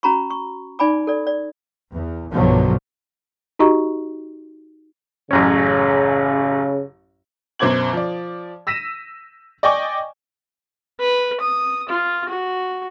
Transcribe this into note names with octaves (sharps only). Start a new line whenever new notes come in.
C#4 F#4 A#5 B5 C#6
C#6
D#4 D5 G#5 B5 D6
A4 D5
D5
E2
B1 G2 D3 F3 F#3
D#4 F#4 G4 D#5 A#5 C#6
A1 F#2 C#3 C#4
F#2 B2 C5 D6 G#6 F#7
F3 D5
E6 A#6 B6 D#7 E7
D5 D#5 G5 G#5 C#6 D6
B4
D#6
F4
F#4